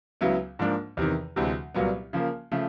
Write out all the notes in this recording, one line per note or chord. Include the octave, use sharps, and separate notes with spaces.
C#2 C#3 F#3 B3 E4
G#2 F3 A#3 D4
E2 C3 D#3
D2 C3 E3 G#3
C2 A#2 F#3 B3
C#3 F3 A#3
C#3 F3 A3